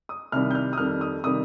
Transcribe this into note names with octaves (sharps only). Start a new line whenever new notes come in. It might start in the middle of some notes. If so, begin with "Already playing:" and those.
D#6
C2 C3 D#3 G3 F6
G6
F6
D#6
F2 D#3 G3 F6
D#6
C3 D#3 G3 D#6